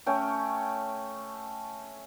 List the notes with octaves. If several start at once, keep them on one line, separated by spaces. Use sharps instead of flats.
A3 C#4 C#5 G5